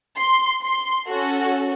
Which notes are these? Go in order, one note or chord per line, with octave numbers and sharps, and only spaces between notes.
C6
C6
C#4 F#4 A4